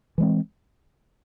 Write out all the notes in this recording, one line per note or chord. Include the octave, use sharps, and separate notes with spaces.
E3 G#3 C4